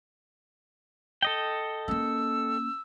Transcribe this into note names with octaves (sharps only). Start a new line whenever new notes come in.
A4 D#5 G5
A#3 C#4 E6